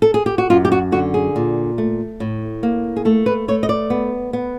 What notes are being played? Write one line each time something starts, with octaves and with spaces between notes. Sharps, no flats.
A4
G#4
G4
F#4
F#2 F4
G4
F#4
D3 F#4
G#4
A#2
A3
A2
A#3
G#4
A3 A4
B4
A3 C#5
D#5
D5
B3
B3